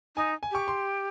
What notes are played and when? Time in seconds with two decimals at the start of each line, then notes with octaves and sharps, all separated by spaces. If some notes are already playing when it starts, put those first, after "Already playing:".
0.16 D#4 G#5
0.43 G#5
0.51 G4 C#6
0.68 C6